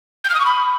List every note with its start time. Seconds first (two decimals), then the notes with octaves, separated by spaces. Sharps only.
0.24 G6
0.30 F6
0.35 D#6
0.40 C#6
0.45 B5